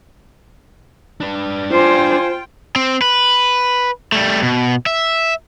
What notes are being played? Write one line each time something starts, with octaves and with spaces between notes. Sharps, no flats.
D4 B4
F4 C5 G5 G#5
C4
B4
G3 A3
B2
E5